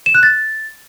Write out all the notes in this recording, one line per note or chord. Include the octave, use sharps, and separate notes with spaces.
E7
F#6
A6